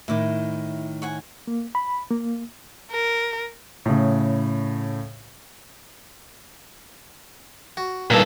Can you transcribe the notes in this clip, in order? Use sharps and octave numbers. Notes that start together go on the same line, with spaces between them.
A2 D#3 E4 D6
C#5 F#5 G#5
A#3
B5
A#3
A#4
A2 C#3
F#4
G2 A#2 D#3 A4